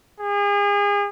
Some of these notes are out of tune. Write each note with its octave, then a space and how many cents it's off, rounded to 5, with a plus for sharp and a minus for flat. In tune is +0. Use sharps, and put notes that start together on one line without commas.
G#4 -35